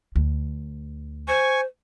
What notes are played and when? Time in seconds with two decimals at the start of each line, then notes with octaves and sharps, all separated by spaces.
0.16 D2
1.28 C5 G#5 C#6